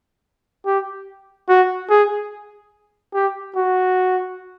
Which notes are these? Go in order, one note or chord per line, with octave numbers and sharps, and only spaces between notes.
G4
F#4
G#4
G4
F#4